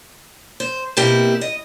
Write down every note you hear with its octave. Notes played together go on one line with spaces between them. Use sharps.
C5
B2 A#3 C4 E4 G4
D#5